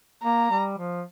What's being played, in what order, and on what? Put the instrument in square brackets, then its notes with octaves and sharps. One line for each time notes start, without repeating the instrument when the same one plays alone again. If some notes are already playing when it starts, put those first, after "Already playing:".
[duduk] A#3 [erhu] A#5
[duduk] G3
F3